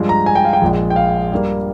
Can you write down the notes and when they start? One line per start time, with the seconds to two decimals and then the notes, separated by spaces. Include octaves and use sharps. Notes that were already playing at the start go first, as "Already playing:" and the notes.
Already playing: G2 F3 G#3
0.09 A#5
0.26 G#5
0.35 G5
0.45 F5
0.53 G5
0.62 A#1 A#2 G#3
0.90 G5
0.96 F5
1.32 G2 G3 A#3